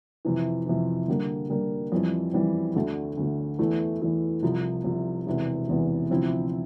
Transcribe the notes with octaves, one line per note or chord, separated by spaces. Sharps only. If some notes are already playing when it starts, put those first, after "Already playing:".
F2 C3 E3
F2 C3 E3
D3 G3 A#3
D3 G3 A#3
F2 E3 G3 C4
F2 E3 G3 C4
D2 D3 A3
D2 D3 A3
E2 E3 A3 E4
E2 E3 A3 E4
C2 C3 F3
C2 C3 F3
E1 E2 C3 E3
E1 E2 C3 E3
D2 C3 F3 C4 E4